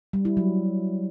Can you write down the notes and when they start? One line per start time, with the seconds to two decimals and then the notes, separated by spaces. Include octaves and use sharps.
0.13 G3
0.25 E4
0.37 F#3